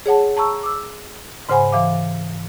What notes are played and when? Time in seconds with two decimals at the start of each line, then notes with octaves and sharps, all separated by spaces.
0.06 G#4 C#5 F#5 A5
0.37 A5 A#5 C#6 E6
0.63 D6 E6
1.49 G#2 C#3 C5 F#5 G#5 B5
1.72 E3 F5 D6